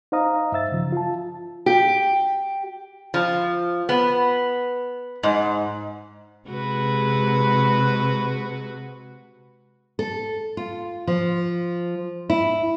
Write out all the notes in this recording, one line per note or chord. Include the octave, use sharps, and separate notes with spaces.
D#4 C5 D#5 F5 A#5 D#6
G2 E5 E6 A6
C#3 F3
F4 A5
G4
F3
B3
G#2
C3 G#3 F#4 B4
A4
F4
F3
E4